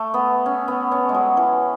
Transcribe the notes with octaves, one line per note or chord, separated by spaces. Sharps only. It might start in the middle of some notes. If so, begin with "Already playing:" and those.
Already playing: A3
B3
C#4
B3
C#4
G#3
F#3
E3